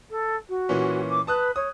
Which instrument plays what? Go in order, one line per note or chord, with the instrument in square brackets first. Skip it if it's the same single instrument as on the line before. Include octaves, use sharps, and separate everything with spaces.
[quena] A4
F#4
[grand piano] A#2 E3 C#4
[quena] D6
[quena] B4 [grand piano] A5 D#6 F#6
[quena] C#5 [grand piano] D#6